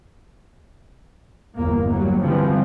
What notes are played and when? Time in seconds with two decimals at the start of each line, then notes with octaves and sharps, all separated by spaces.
1.57 G1 E2 A#3
1.89 F#3 G3
2.23 D3 E3 F3 G3 G#3 C4